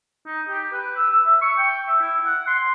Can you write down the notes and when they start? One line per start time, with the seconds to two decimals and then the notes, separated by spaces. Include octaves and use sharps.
0.26 D#4
0.49 G4
0.73 B4
0.96 E6
1.10 E6
1.26 E5
1.42 C#6
1.58 G5
1.88 E5
2.01 E4
2.26 F#5
2.47 C6